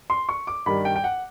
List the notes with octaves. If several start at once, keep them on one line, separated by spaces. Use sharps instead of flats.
C6
C#6
D6
G2 D#3 G3 B5
G5
G5
F#5